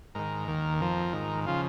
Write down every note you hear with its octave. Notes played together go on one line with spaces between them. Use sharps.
G#2 D#3 A#4
D#2 D#3
F2 F3 A#4
G#2 D#3
C#3 F3 F4